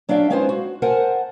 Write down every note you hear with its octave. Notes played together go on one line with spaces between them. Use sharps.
F#3 D4 E5 F5 G5
G#3 C#4 D#4 F4 B4 C5
F#4
A#4 C5 F#5 G#5 A5